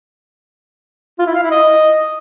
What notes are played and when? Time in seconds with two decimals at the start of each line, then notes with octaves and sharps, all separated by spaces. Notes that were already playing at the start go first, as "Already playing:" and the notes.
1.19 F4
1.27 E4
1.35 F5
1.43 E4
1.51 D#5